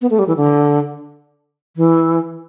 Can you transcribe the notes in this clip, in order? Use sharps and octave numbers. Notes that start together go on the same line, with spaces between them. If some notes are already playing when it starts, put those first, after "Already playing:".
B3
A3
G3
E3
D3
E3